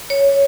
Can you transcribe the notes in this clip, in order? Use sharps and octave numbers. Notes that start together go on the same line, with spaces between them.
C#5